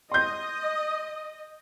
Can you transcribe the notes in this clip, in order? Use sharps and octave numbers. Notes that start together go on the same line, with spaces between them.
D#5 C6 G6